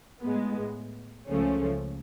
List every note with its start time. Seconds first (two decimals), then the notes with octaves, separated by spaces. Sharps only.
0.22 A2 G#3 B3
1.27 C#2 C#3 F3 A3 C#4